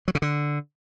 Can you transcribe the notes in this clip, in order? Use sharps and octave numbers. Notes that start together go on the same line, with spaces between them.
F#3
C#3
D3